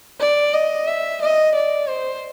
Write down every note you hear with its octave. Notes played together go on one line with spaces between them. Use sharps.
D5
D#5
E5
D#5
D5
C5